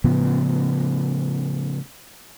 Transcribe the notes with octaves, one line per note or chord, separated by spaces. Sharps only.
A2 C#3 F3 B3